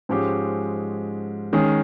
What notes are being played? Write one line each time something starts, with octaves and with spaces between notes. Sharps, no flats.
G#2 F3 G#3 C#4 G4
D#3 G#3 C#4 G#4